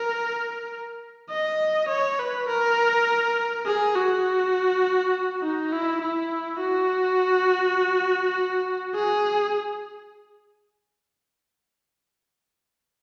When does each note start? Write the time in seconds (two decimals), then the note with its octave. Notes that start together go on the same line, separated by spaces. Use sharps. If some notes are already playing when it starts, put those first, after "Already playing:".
Already playing: A#4
1.30 D#5
1.88 C#5
2.19 B4
2.48 A#4
3.66 G#4
3.95 F#4
5.42 D#4
5.72 E4
6.01 E4
6.60 F#4
8.95 G#4